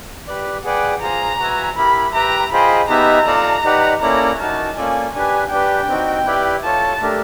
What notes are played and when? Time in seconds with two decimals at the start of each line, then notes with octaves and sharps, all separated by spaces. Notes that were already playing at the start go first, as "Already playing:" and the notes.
0.27 G4 B4 D5
0.64 G#4 B4 D5 F#5 G5
1.01 F4 G#4 C5 A#5
1.39 F#4 B4 E5 G#5
1.77 E4 G4 A#4 B5
2.14 G4 B4 E5 G5 A#5
2.52 F4 G#4 C5 D#5 G5 B5
2.89 B3 D#4 G4 B4 E5 A#5
3.26 F4 A4 D5 F5 A5
3.64 D#4 G4 B4 D5 F#5
4.01 A#3 C#4 E4 A4 D5 A#5
4.39 D#4 F#4 A#4 A5
4.77 A#3 C#4 F4 A4 D5 G#5
5.14 D4 G4 B4 G#5
5.51 D4 G4 B4 G5
5.89 C4 D#4 F#4
6.26 E4 G4 B4 D5
6.63 F4 A4 C#5 A5
7.02 A3 D4 G4 A#4